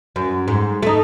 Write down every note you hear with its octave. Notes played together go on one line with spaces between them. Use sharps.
F#2
G#2
A3 D#4